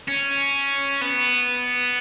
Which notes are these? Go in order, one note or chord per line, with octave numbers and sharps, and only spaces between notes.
C#4
B3